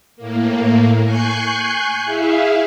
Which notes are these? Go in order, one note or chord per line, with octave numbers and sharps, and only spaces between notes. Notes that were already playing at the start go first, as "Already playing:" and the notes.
A2 A#3
G#5 C#6 F#6 G6 C7
E4 G#4 E5 F5